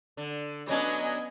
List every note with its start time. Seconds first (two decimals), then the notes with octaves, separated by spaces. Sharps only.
0.17 D3
0.69 F#3 B3 C#4 D4 D#5 G#5